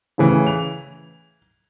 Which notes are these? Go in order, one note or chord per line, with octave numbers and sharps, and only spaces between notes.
A2 C#3 E3
F7